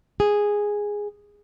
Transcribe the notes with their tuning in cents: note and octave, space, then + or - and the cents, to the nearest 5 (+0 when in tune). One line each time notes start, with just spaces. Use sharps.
G#4 -5